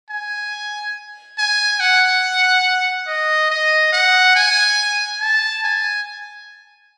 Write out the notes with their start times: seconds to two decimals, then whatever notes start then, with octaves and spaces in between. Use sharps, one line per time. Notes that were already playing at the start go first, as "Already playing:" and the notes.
0.10 G#5
1.38 G#5
1.80 F#5
3.08 D#5
3.51 D#5
3.93 F#5
4.36 G#5
5.21 A5
5.64 G#5